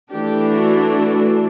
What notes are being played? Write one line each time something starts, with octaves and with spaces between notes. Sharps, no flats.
E3 A3 D4 G4
F#4